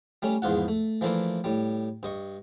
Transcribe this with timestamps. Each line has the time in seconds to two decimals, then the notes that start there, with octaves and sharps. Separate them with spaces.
0.22 G3 A3 C#4
0.42 A#1 E2 G#2 F4 F#5
0.68 A3
1.01 E3 F3 A3 A#3 D4 E4
1.44 A2 G3
2.03 G2 D#5 C#6